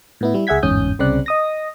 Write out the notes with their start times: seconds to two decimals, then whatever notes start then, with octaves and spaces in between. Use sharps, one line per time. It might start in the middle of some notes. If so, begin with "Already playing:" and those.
0.21 A2 B3 E4
0.34 G3 E4
0.47 C#2 G#4 E5 F#5 G#6 B6
0.63 G1 E2 G#2 C#4 D#6 G6
0.99 C2 C#3 C4 D5 F#6
1.26 D#5 D#6 A#6